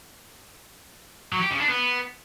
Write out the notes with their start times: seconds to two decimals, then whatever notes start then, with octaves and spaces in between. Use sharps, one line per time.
1.33 F#3
1.42 G4
1.51 C#3
1.60 D4
1.69 B3